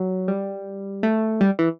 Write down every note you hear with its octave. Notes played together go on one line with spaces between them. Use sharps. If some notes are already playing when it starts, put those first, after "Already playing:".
Already playing: F#3
G3
A3
G3
E3